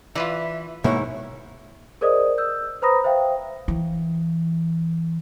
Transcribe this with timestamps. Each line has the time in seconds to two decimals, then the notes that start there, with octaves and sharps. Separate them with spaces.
0.15 E3 F4 B4 D5 E5
0.84 G#2 B2 A#3 B3 E4 C#5
2.01 G#4 A#4 C5 D5 D#5 D#6
2.38 E6 G6
2.82 B4 C5 A#5 B5 D#6 A#6
3.04 C5 E5 F5 G5
3.68 E3